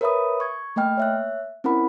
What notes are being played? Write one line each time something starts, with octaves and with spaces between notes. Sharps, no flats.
A#4 B4 C#5 E5 B5 D#6
C#6 G#6
A3 A#3 D#5 G5 F6
C#5 E5 F#6
C4 C#4 E4 A#4 F#5 B5